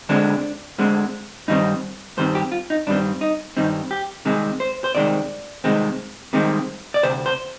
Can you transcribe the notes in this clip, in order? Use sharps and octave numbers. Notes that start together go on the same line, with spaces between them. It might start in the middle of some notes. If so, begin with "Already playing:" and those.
D2 D3 G#3 C4 D4
D2 D3 G#3 C4
G2 D#3 G3 C4 D#4
G2 D#3 G3 C4 C5
G4
F4
D#4
G2 D#3 G3 C4 D4
D#4
G2 D#3 G3 C4 D#4
G4
C2 C3 D#3 G#3 C4 G#4
C5
C5
C2 C3 D#3 G#3 C4 D5
C2 C3 D#3 G#3 C4
C2 C3 D#3 G#3 C4
D5
D2 C3 C5
C5